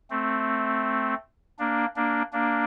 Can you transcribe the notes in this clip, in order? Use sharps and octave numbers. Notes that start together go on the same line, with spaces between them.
A3 C4
A#3 D4
A#3 D4
A#3 D4